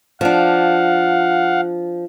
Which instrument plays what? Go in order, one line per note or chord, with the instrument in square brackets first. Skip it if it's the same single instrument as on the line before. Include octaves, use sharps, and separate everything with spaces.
[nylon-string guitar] F3 D4 [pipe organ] F5 F#5